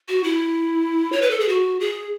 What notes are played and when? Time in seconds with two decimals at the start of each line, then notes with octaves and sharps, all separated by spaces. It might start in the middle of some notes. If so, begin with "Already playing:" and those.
0.08 F#4
0.24 E4
1.12 C#5
1.22 B4
1.30 A4
1.40 G#4
1.49 F#4
1.80 G#4